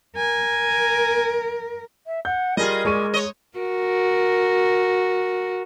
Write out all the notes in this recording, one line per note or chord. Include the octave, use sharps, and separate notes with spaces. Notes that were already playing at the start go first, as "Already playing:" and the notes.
A#4 G#5
E5
F#5 G6
G3 F4 G#4 A#4 D#5
A#2 G#3 C#6 D#7
C#5 D#5
F#4 A#4